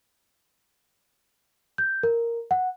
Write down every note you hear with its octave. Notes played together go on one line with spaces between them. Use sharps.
G6
A#4
F#5